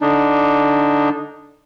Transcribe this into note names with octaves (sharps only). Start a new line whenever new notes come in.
D3 D4 D#4